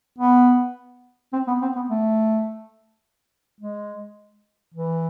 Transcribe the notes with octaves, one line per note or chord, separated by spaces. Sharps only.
B3
C4
B3
C4
B3
A3
G#3
E3